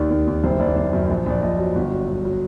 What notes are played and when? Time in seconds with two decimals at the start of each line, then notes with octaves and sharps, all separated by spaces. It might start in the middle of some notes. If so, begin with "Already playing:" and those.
Already playing: D#2 D#3 D5
0.11 D#2
0.27 D#2
0.44 F#1 C5
0.60 F#1 D5
0.76 F#1 C5
0.93 F#2
1.10 A#1
1.26 A#1 D5
1.42 A#1 D#5
1.59 F#3
1.75 G1
1.92 F#3
2.08 G1
2.25 F#3